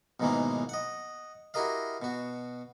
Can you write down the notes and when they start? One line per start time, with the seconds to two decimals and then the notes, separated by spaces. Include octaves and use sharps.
0.20 B1 G#2 B2 D#3 E3 A#3
0.69 D#5 F#5
1.54 E4 F#4 G4 A#4 D#5 F5
2.02 B2 F#4